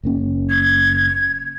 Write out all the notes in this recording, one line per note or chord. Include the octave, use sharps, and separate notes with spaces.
F#1 A#3 C#4
G#6